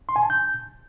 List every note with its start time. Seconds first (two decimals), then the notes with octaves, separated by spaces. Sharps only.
0.09 C6
0.16 G#5
0.23 A5
0.30 G6